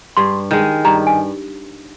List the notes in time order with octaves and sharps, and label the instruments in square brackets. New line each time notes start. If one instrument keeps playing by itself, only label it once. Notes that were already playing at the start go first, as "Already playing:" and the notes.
[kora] G2 [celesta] C6
[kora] D#3 G#3
[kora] G2 [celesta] A#5
[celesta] G#5